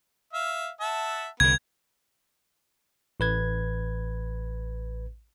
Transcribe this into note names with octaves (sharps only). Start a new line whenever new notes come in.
E5 F5
E5 F#5 A5
C2 D3 B3 G#6
A1 B4 G#6